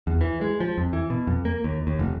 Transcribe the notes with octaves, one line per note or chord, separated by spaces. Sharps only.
E2
E3
G#3
F3
F2
E3
B2
F2
A#3
D#2
D#2
F1